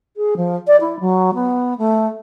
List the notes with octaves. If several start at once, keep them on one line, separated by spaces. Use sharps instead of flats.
G#4
F3
D5
E4
F#3
B3
A3